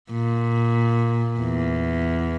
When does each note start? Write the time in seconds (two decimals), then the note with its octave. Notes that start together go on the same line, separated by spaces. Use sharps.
0.11 A#2
1.40 E2